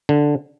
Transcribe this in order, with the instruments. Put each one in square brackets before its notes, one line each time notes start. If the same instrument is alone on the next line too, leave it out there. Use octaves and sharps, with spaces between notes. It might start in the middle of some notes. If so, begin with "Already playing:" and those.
[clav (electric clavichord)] D3